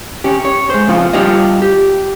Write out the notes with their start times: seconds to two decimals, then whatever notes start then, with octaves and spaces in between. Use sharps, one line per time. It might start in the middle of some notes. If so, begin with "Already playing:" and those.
0.24 C#4 G4
0.45 C#5
0.70 G#3 C5
0.87 F2 A#2 C#3 F3 F4
1.13 G3 D4 F4 G4 C#5 D#5
1.62 G4